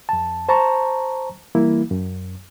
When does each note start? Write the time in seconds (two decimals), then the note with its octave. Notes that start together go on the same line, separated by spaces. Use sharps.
0.09 F2 A5
0.49 C5 A5 A#5 C#6
1.55 E3 G3 A#3 E4
1.91 F#2